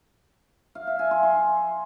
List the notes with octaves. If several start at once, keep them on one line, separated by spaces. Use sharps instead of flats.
F5
E5
G#5
C6
C6